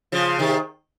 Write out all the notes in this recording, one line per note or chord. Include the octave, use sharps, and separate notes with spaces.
C#3 F3
C3 D#3